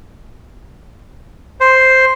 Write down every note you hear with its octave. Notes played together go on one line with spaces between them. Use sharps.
C5